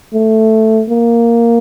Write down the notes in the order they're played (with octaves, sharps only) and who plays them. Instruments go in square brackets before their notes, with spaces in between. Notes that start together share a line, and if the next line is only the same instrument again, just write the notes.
[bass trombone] A3
A#3